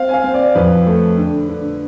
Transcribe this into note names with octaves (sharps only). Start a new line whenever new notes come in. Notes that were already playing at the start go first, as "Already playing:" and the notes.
Already playing: C4 F5
G#5
F5
C4
D5
F2 B4
A3
D3
D3